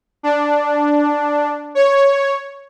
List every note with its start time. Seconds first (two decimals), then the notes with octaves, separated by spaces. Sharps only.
0.23 D4
1.75 C#5